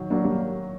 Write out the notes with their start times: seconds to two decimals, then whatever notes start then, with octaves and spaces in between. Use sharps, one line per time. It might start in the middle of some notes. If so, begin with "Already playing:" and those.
Already playing: D#3 F#3
0.10 F#3 A#3 D4
0.24 G3 A#3